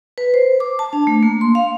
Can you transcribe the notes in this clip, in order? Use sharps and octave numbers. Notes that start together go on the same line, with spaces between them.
B4
C5
D6
A5
D4
A3
A#3
C6
F5